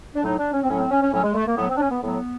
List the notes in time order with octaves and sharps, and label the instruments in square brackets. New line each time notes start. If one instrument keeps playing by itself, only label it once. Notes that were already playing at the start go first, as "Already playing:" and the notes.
[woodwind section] D4
A2 F#3 D#4
D4
C#4
C4
A2 F#3 C#4
C4
C#4
C#4
A2 F#3 C#4
G#3
A3
A#3
A2 F#3 B3
C4
D4
C#4
B3
A2 F#3 B3